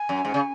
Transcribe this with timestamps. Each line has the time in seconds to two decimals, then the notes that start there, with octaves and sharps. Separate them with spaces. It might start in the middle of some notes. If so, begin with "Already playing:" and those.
Already playing: G#5
0.09 F#2
0.25 G#2
0.34 C#3